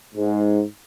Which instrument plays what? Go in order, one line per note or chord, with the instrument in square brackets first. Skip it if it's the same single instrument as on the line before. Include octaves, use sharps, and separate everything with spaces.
[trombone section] G#2